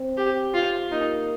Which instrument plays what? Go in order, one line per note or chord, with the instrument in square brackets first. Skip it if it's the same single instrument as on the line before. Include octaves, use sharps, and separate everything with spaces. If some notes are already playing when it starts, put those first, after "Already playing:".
Already playing: [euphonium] C4
[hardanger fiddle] G4
F4
[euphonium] A#3 [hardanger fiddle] D#4